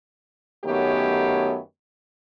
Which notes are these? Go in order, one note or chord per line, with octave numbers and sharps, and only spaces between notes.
F#2 D#3 A3 B3 G4 C#5